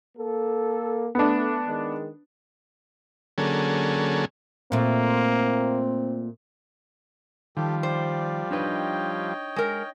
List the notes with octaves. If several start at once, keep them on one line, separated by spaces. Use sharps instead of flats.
A#3 A4
A3 B3 D4
D#3 G#3
D3 F#3 A#3 C#4 G#4 A4
A#2 A3 A#3 C4
D#3 F3 G3 G4 A4
C5 D5
D4 D#4 B4 C#5 D#5 G5
G#3 A#4